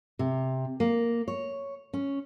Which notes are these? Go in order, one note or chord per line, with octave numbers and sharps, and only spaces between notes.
C3
A#3
C#5
C#4